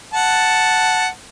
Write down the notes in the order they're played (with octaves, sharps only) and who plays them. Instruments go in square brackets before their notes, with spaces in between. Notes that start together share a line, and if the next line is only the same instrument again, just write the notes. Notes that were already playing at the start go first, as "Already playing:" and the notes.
[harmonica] F#5 A5